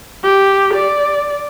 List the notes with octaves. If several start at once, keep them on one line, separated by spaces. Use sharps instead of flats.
G4
D5